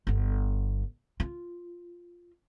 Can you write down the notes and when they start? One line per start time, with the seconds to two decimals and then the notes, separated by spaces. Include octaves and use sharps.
0.07 G1 B3
1.20 F4